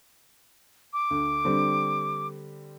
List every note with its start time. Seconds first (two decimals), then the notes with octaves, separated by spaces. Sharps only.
0.93 D6
1.11 D2
1.45 D3 G3 C4